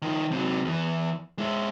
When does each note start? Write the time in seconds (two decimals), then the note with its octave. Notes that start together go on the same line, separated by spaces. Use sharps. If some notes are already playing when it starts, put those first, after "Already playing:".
0.02 D#3 F3
0.31 C3 F#3
0.65 E2 E3
1.38 G#3 E4